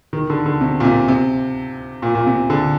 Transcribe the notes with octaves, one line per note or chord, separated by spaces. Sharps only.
D#3
D3
D3
C3
A#2
C3
C3
A#2
A#2
C3
D3